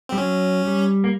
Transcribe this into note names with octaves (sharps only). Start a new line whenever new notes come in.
C4
G3
F#3 C#4
G3
A#3